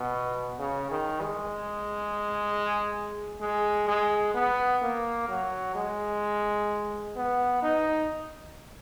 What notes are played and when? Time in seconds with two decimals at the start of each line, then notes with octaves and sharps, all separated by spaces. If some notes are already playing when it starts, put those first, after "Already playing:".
Already playing: B2
0.59 C#3
0.91 D#3
1.22 G#3
3.41 G#3
3.88 G#3
4.34 B3
4.82 A#3
5.29 F#3
5.76 G#3
7.16 B3
7.63 D#4